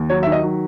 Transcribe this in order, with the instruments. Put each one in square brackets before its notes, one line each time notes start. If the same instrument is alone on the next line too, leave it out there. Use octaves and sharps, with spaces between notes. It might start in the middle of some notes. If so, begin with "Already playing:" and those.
Already playing: [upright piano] D#2
F#3 C#5
D#3 E5
D#5
F#3